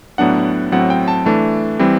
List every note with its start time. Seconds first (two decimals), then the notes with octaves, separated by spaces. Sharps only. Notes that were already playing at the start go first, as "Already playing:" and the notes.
0.18 A2 F#3 B3 D4 F#5
0.72 A2 F#3 C4 F#5
0.90 G5
1.08 A5
1.26 E3 A3 D4 A5
1.79 E3 G3 C4